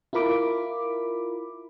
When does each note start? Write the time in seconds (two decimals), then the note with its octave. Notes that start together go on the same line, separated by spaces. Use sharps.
0.13 E4 F4 A#4 B5 D6